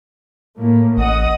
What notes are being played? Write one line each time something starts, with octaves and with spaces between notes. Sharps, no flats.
A2 A#3
A1 D#5 F#5 D#6